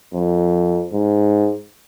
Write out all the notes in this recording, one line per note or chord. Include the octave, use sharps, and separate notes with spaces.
F2
G#2